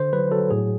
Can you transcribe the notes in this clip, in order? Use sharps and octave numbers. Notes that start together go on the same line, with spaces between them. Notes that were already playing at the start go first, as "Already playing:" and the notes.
Already playing: D3 C5
F#3 B4
F#3 A4
A2 G#4